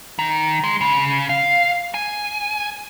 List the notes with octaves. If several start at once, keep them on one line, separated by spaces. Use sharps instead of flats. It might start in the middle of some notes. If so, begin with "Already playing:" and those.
D#3
G#3
C#3
F5
G#5